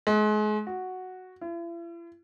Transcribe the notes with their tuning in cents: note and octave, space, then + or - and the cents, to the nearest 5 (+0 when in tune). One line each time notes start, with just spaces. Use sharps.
G#3 +35
F#4 +0
E4 +45